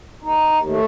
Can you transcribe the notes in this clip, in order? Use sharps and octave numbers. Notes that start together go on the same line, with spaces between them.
D#2 D#4
D#2
D#2
A3